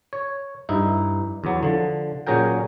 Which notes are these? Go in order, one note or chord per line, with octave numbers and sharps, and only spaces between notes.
C#5
G2 D#4 E4
E2 F#3
D3 F3
A#2 F#3 C#4 G#4 A#4 G5